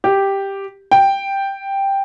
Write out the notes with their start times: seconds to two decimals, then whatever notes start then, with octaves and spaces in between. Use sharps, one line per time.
0.04 G4
0.92 G5